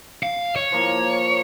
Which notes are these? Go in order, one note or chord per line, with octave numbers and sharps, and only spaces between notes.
F5
C#5
F3 A#3